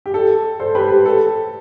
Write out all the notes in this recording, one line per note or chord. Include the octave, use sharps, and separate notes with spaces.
G4
A4
A4 C5
G4 B4
G4
A4